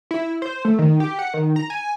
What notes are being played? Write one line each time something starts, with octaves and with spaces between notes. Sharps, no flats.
E4
C5
A3
D#3
G4
F#5
D#3
A#5
G#5